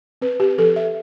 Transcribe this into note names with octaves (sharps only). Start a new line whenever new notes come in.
C4 B4
G4
F3 A4
E5